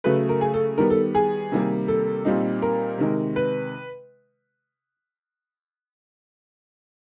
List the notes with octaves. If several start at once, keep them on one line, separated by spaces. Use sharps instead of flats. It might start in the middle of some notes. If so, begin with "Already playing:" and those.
C#3 F#3 A3 B4
A#4
G#4
A4
D#3 G3 B3 A#4
A4
G#4
C3 D#3 G3 A#3
A4
A#2 G3 C4 D#4
A#4
C3 D#3 G#3
B4